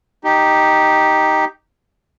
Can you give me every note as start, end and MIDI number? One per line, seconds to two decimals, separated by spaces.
0.24 1.45 63
0.24 1.45 67